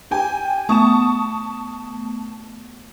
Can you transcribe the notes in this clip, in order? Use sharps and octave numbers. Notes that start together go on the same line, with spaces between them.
G4 G5 G#5
A3 B3 A5 C#6 D#6 E7